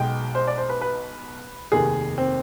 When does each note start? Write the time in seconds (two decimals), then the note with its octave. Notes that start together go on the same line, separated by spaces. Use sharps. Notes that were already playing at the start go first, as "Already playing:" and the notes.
Already playing: B1 B2 G#3 G5
0.35 C5
0.47 D5
0.58 C5
0.69 B4
0.81 B4
1.72 F1 D#2 D#3 G#4
2.18 C4